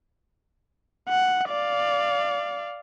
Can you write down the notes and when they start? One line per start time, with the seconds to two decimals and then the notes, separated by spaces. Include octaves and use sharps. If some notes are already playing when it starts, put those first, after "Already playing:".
1.09 F#5
1.49 D5 F5